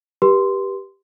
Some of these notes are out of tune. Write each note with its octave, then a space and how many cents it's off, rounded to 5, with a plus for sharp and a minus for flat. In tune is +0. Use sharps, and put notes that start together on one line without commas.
G4 +0 B4 -30 C6 -10